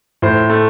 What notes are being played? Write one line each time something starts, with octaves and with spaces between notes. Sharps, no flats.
A2 C5
A3